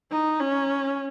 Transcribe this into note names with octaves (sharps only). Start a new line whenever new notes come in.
D#4
C#4